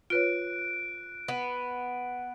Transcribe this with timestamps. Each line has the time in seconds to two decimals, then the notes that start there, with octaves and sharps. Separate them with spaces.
0.10 F4 B4 C#5 F#6 D7
1.28 B3